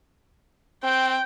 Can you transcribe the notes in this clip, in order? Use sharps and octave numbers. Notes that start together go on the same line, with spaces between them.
C4 G5